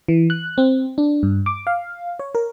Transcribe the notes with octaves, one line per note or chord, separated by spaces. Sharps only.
E3
F#6
C4
D4
G2
D6
F5
C#5
A#4